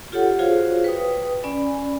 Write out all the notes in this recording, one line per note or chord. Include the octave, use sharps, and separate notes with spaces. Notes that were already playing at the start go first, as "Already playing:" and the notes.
F4 G4 A4 C#5 F#5
F4 F#4 G#4 C5 C#5 F5
B4 G5 D#6
C#4 D5 G#5 B5